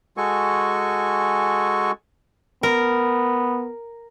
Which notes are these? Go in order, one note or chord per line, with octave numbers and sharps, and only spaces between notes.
G#3 F#4 A4 G#5 C#6
B3 A#4